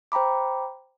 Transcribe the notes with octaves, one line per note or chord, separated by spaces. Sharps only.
C5 G5 A#5 B5 D6